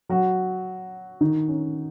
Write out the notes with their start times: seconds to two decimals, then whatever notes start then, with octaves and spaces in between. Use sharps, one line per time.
0.09 F#3 F#4
1.21 D#3 D#4
1.48 C#4